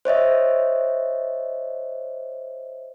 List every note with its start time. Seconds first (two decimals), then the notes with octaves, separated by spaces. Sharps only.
0.05 C5 C#5 D#5 E5